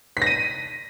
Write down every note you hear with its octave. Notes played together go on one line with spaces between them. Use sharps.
A#6 B6 D#7